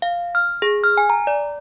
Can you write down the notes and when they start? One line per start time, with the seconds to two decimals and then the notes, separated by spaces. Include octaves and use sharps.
0.02 F5
0.35 F6
0.62 G#4
0.84 F6
0.97 G#5
1.10 A#5
1.27 D5